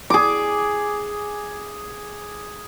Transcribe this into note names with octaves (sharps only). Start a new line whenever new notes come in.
G#4 D6